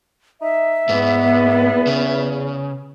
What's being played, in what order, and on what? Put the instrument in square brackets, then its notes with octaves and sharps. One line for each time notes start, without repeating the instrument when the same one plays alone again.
[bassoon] D#4 [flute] E5
[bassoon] E2 [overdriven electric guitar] G#2 [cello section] B3
[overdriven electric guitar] C#3